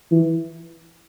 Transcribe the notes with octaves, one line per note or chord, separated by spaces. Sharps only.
E3